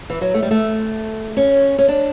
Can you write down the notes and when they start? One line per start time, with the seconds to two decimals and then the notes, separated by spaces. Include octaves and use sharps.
0.10 E3
0.21 F#3
0.34 A3
0.42 G3
0.51 A3
1.37 C#4
1.78 C#4
1.88 D4